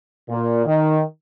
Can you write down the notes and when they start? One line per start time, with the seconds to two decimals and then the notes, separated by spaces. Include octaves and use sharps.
0.29 A#2
0.66 D#3